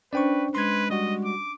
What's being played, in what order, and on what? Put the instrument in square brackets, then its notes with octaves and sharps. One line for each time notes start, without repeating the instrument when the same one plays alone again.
[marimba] C#4 D4 C5 [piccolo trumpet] B4 [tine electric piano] D5 G5 C#6
[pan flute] G#3 [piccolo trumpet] B4 [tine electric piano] C6 G#6
[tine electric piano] G3 F#4 [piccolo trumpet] D#5
[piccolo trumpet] D6